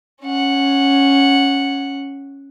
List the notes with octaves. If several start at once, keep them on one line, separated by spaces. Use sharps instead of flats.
C#4 F#5